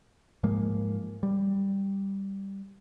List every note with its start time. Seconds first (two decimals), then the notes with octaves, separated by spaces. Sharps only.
0.43 G#2 F3 G#3 A#3
1.23 G3